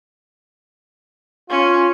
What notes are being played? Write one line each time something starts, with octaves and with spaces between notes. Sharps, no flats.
C#4 F4